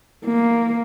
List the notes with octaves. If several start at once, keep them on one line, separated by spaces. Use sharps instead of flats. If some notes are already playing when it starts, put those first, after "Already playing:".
A#3